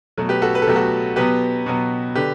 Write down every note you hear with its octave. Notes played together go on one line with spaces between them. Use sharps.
B2 F#3 A3
G4 B4
F#4 A4
B4
A4
B2 F#3 A3 G4
F#4 A4
B2 F#3 B3 G4 B4
B2 F#3 B3
D3 G4 B4